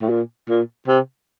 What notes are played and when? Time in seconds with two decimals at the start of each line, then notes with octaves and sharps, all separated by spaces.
0.02 A2
0.09 A#2
0.49 A#2
0.87 C3